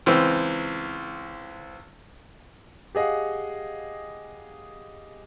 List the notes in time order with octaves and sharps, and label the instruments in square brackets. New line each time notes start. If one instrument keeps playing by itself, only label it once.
[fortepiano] C#2 E3 C4
[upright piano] G4 G#4 D#5 F5 F#5